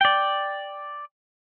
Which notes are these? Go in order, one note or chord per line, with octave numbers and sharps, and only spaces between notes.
D5 G5